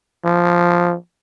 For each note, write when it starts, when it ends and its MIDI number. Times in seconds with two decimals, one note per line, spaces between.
0.25 0.95 53